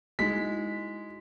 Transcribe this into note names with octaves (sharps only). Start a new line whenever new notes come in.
G#3 D#4 E4 F#4 B6